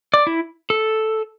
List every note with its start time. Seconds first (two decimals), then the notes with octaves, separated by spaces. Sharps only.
0.14 D5
0.27 E4
0.70 A4